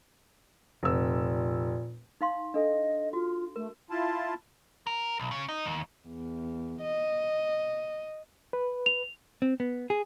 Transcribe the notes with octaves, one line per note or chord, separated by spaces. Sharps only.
F1 A#2 E6
D#4 F5 C6
D4 A4 D#5
F4 F#4
A3 A#4
E4 F4 A5
A#4
B1
C#3
D#4
D#2
E2
D#5
B4
F7
C4
B3
G#4